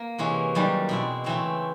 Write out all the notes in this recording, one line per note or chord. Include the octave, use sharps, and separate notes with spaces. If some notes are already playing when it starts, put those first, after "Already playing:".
Already playing: A#3
C3 E3 G#3 C#4
F#2 D#3 G3
B2 G#3 C4 E4
C#3 E3 A3 C4